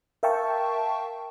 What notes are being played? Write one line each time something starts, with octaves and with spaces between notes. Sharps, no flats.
A#4 E5 F5 G5 A5 C#6